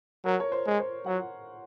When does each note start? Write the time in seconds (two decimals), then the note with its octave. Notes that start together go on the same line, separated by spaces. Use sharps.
0.25 F#3 A#4
0.40 C#5
0.52 C5
0.66 G#3
0.80 C5
1.06 F#3 F#5